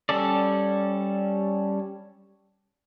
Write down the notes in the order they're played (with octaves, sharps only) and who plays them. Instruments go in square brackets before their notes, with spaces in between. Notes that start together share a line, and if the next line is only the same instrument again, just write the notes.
[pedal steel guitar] G3 C#4 A4 D5